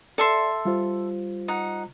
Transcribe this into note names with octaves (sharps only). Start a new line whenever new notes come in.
A4 D5 E5 C6
G3 F4 C5
D#4 F#5